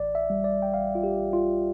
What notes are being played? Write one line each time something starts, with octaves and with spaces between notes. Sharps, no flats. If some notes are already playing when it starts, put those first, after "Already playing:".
Already playing: A1 D5
E5
G3
D5
G5
A1 F5
F4
G4
A1
F4